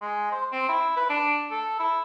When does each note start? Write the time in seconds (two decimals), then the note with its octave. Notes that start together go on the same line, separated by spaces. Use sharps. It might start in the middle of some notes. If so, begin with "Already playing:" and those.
0.02 G#3
0.32 C5
0.52 C4
0.69 E4
0.96 B4
1.10 D4
1.51 A4
1.79 E4